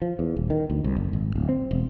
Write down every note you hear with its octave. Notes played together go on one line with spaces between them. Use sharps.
F3
E2
D#1
D#3
D2
C2
F#1
G#1
D1
C4
E1